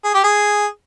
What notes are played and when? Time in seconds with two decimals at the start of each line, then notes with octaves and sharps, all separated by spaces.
0.04 G#4
0.14 G4
0.24 G#4